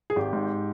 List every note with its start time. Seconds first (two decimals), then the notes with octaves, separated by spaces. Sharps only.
0.10 G#4
0.16 G#1 G4
0.33 G#2